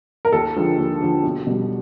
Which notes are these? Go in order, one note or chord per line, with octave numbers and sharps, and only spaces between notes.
A#4
D#2 A4
D3 F3 G#3
D#2
D3 F3 G#3
B1
B2 G3